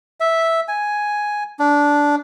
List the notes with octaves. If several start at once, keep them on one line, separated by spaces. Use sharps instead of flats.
E5
G#5
D4